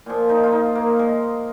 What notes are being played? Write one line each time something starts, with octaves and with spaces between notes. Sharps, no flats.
A#2 F3
D#4
F4
D#4
A#3
G#3